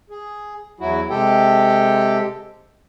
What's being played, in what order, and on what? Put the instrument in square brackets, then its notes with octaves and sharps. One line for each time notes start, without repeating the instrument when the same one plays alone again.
[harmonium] G#4
E2 F#3 E4 F#4
C3 G#3 G4 A4 G5